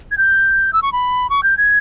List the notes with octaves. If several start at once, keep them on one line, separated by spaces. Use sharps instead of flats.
G#6
G6
E6
C#6
B5
C#6
G6
G#6